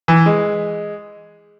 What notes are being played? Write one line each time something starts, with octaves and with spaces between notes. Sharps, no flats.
E3
G#3